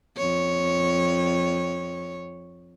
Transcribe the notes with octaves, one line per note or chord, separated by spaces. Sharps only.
F2 C#5